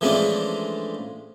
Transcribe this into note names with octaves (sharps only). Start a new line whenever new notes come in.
E3 F3 G#3 A3 C#4 D4